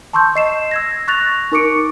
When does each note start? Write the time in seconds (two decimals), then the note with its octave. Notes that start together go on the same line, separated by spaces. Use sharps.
0.13 A5 C6 C#6 E6 G6
0.35 D#5 C7 E7
0.71 E6 G#6 A#6
1.08 C#6 F#6 A6 A#6 F7
1.52 D#4 A#4 C#6 D6 C#7 D7